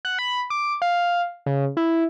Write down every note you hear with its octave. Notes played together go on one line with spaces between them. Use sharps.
F#5
B5
D6
F5
C#3
E4